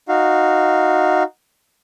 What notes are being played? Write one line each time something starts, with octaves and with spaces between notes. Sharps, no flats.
D#4 F#4 F5